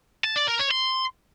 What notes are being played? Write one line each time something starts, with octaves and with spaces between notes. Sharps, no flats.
A5
D5
A#4
C#5
C6